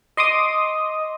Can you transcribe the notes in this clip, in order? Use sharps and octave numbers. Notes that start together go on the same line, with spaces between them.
D#5 C6 D6 D#6